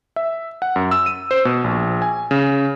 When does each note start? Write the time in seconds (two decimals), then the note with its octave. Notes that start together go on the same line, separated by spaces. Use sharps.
0.16 E5
0.62 F#5
0.76 F#2
0.91 E6
1.06 D#7
1.31 C5
1.45 B2
1.64 A#1
2.02 G#5
2.31 C#3